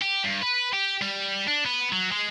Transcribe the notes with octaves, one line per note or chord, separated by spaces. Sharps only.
G4
G2
B4
G4
G3
D4
B3
F#3
G#3